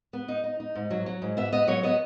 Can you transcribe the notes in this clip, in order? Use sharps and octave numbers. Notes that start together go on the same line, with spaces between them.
B3
D#4
D#4
D#4
G#2
F#3
F#3
G#2
B3 E5
B3 D#5
F#3 C#5
B3 D#5